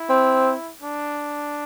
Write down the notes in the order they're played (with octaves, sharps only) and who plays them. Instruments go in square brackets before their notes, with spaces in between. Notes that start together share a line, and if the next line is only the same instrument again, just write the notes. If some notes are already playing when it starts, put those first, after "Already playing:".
Already playing: [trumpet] E4
[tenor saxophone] C4
[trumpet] D4